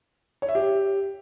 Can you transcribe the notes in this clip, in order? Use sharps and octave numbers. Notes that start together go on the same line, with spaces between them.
C#5
E5
G4